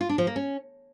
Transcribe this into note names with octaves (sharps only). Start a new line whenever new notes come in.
F4
D4
F3
A#3
C#4